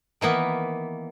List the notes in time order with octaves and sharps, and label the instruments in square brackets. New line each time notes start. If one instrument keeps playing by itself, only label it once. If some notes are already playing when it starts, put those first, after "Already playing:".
[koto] D#3 E3 A#3 B3